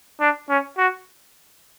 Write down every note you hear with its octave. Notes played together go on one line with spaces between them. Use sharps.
D4
C#4
F#4